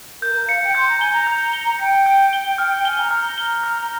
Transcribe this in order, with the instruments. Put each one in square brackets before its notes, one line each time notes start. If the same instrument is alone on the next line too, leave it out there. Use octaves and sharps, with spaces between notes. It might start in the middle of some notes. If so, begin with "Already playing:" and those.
[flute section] A#4 [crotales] G6
[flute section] A#4
[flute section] F5 [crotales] C#7
[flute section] G5
[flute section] C6 [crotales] G6
[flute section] A#5
[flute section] G#5 [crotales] G7
[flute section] A#5
[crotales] G6
G7
[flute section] G5 [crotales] C#7
[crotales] G6
G7
F6
[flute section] G#5 [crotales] G7
[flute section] A#5
[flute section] A#5 [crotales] F6
[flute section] A#5
[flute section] A#5 [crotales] G7
[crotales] F6